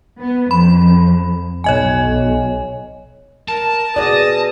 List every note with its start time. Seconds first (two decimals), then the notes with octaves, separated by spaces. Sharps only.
0.20 B3
0.51 F2 B5
1.64 B1 C#5 D#5 G#5
3.48 A#4 A5
3.96 B2 G#4 D5 F#5 D#6 A#6